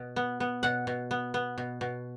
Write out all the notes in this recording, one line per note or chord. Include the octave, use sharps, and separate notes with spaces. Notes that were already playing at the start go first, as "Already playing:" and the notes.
Already playing: B2
B3
B3
B2 F#5
B2
B3
B3
B2
B2